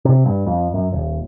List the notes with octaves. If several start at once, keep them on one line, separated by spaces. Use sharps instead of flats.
C3
G2
F2
F#2
D#1